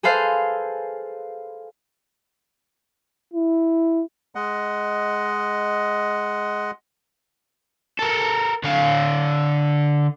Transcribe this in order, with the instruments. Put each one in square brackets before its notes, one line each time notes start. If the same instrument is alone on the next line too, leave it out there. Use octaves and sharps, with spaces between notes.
[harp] G#4 A4 B4 C5 F5
[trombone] E4
[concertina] G#3 D#5 F#5
[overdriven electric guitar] A4 A#4
D3 F5